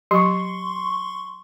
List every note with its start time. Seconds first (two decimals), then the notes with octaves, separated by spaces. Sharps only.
0.11 F#3 G4 C6 C#6